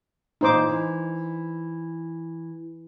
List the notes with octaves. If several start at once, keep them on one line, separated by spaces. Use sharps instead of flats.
A#2 E3 D#4 C5 D6
E3